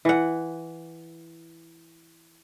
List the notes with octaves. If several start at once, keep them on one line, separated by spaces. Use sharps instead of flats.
E3 F#5